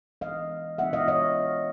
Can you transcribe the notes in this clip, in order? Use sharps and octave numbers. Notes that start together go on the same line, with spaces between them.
E3 G#3 B3 D4 D#5 F5
E3 G#3 B3 D4 E5 F#5
D#5 F5
C#5 D#5